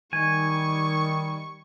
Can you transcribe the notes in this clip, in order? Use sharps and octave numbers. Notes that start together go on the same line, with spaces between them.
D#3 G3 G#5 C#6